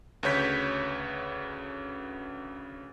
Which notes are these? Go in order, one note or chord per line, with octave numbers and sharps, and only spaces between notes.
D2 C#3 B4 C#5 G6 B6